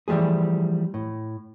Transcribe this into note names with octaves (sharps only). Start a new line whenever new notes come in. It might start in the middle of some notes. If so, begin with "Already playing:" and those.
E3 F3 G3 A3 G#4
A2